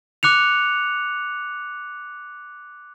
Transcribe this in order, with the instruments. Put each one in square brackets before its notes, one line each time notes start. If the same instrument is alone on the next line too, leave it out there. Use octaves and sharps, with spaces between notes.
[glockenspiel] D6 F#6 C#7 F7